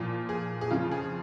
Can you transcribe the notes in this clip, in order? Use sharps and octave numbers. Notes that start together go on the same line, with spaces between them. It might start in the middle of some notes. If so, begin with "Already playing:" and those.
Already playing: A#2 F3 F4
G#4
G#4
F2 C#3 F3 F4
G#4